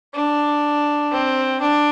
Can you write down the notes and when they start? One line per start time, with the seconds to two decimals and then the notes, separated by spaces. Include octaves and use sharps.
0.14 D4
1.11 C4
1.61 D4